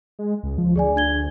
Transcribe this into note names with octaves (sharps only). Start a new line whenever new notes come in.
G#3
C#2
F3
D2 G#4 D5 G#5
D4 G#6 G7